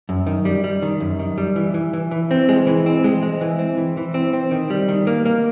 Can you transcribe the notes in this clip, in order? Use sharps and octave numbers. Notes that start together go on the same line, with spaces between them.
F#2
D#3
G3
G3
D#3
F#2
D#3
G3
E3
E3
E3
E3
C4
G#3
E3
C4
G#3
G#3
E3
C4
E3
E3
C4
C4
D#3
G3
D#3
A#3
A#3